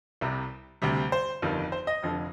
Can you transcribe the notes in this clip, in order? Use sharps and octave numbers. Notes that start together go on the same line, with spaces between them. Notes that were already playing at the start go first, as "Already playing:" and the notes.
C2 C3 G3
D2 C3 G3
C5
G1 F2 D#3 G3
C5
D#5
F1 F2 D3 F3